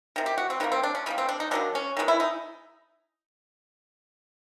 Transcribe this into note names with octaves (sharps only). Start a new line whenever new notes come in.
C3 D#3
G4
F#4
C4
D#3 G3 A#3 B3
C4
D4
C#4
D#3 G3 A#3 B3
C4
D4
D#4
D#3 F#3 A#3 D4
C#4
D#3 G#3 B3
E4
D#4